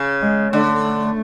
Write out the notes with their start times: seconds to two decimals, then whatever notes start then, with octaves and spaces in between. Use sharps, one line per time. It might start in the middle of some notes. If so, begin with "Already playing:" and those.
Already playing: C#3
0.22 G#3
0.53 D3 A3